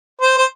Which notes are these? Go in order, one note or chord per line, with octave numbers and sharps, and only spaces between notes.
C5
C5